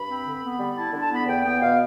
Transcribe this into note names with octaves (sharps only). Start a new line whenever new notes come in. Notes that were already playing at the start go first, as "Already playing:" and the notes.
Already playing: G2 B5
C4
D3
B3
G3
E4 A5
D3
A5
B3 B5
E2 G5
B3 G5
B2 F5